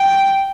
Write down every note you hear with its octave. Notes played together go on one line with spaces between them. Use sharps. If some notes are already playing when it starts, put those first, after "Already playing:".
Already playing: G5